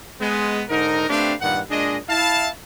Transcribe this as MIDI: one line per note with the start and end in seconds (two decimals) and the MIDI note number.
0.20 0.63 56
0.20 0.63 59
0.69 1.05 44
0.69 1.05 50
0.69 1.05 63
0.69 1.05 70
1.09 1.33 57
1.09 1.33 60
1.09 1.33 62
1.09 1.33 67
1.09 1.33 71
1.09 1.33 77
1.41 1.60 43
1.41 1.60 46
1.41 1.60 51
1.41 1.60 78
1.70 1.97 46
1.70 1.97 56
1.70 1.97 62
1.70 1.97 68
1.70 1.97 75
2.08 2.49 64
2.08 2.49 77
2.08 2.49 81